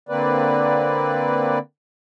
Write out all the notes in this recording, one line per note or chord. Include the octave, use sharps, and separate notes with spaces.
D3 A#3 C4 B4 D5